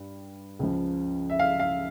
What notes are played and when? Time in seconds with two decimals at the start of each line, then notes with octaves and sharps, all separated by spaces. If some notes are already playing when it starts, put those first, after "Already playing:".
Already playing: G2
0.59 C#2 C#3 F3
1.30 E5
1.39 F5
1.59 F5